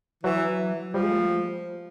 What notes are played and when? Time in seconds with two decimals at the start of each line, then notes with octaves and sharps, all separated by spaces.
0.23 E3 F#3
0.94 F3 G3
1.02 G#3
1.11 A3